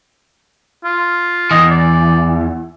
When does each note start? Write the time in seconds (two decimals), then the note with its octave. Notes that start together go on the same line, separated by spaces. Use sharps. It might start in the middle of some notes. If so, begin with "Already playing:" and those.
0.84 F4
1.51 E2 E3 D#5
1.71 D5